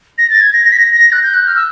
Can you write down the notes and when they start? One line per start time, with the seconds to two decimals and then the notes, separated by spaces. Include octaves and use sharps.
0.18 A#6
0.30 A6
0.41 G#6
0.53 A#6
0.65 A#6
0.72 B6
0.77 A#6
0.94 A#6
1.12 F#6
1.23 G6
1.34 F#6
1.47 F6
1.56 E6